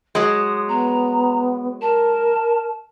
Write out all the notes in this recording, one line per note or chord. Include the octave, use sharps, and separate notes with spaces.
F#3 G#3 D#6
B3 A#5
A#4 A5